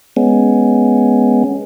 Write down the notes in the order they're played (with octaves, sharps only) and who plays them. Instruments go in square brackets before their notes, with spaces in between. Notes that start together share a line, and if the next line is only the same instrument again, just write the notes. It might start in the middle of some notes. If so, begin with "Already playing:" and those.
[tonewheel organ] G#3 B3 C#4